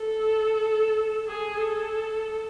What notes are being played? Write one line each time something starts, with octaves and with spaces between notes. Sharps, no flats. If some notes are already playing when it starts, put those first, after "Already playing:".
Already playing: A4
G#4
A4